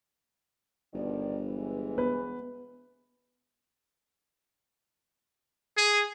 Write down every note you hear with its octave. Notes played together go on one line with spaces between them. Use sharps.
G1 B2 D#3 D5
E3 G#3
B3 B4
G#4